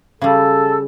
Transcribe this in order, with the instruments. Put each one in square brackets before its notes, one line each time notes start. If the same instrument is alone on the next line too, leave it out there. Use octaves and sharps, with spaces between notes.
[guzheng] C#3 G3 [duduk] A4